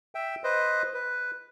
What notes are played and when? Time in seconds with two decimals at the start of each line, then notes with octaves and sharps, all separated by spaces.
0.15 E5 G5
0.44 B4 C5 D#5
0.94 B4